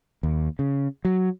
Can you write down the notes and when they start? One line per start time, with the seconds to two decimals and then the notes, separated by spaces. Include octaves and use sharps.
0.23 D#2
0.59 C#3
1.05 F#3